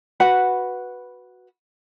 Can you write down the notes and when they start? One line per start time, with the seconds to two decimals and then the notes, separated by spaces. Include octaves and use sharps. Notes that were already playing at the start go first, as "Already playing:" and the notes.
0.20 F#4 B4 F#5 B5